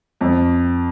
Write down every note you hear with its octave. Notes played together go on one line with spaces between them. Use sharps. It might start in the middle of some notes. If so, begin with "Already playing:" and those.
F2